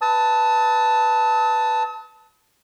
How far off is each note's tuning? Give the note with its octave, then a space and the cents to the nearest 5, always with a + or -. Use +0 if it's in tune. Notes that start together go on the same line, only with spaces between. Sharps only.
B4 +0 A5 +5 D#6 +45